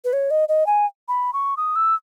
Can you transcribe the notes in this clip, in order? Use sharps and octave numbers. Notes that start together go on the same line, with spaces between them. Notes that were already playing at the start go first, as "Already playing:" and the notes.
B4
C#5
D#5
D#5
G#5
B5
C#6
D#6
E6